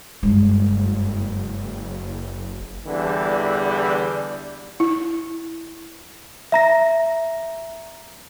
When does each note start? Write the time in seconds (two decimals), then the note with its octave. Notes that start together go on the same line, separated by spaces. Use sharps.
0.23 F#1 G2 G#3
2.87 E2 D3 E3 G3
4.80 E4
6.52 E5 A#5 A#6